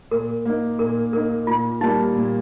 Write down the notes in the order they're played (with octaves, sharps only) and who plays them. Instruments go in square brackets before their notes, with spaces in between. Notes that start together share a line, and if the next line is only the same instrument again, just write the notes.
[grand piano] A#2 [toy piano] A#4
[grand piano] A#3 D#4
[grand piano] A#2 [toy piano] A#4
[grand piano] A#3 D#4 [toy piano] A#4
[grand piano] A#2 [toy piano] F4
[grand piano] G3 A#3 F4 [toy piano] D#4
[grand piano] A#2